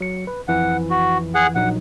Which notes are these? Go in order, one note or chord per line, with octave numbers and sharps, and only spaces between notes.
F#3 C#7
B4
F2 E3 F3 F#5
F#4
G#4 F#5
A#1 F#3 D#4 F#5